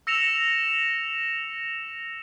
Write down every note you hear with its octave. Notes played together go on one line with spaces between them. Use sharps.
E6 A#6 C#7 E7 F7